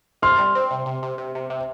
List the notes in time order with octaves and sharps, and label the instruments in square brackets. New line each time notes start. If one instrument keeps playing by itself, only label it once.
[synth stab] C3 [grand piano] C6 F6
[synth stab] G3
C4
C3
C3
C3
C3
C3
C3